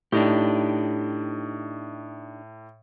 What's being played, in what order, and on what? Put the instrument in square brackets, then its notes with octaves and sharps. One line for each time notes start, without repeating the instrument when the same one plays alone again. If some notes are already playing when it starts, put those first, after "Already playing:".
[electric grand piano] A2 [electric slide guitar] D4 D#4 G4